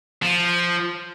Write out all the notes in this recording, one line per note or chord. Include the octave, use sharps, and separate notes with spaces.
F3